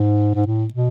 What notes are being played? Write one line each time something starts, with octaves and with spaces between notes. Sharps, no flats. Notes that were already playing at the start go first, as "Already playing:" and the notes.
Already playing: G#2
G#2
A2
B2